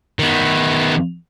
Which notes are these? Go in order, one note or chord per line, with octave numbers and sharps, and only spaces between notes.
D#3 B3